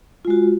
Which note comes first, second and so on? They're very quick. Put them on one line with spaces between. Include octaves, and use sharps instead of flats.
F4 G#3 F#4